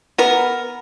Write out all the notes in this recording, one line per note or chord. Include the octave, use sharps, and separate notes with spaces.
B3 A#4